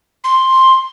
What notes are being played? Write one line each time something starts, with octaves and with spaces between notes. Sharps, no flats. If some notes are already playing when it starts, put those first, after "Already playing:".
C6